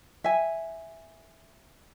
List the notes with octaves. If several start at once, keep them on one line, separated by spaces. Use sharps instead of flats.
E5 G#5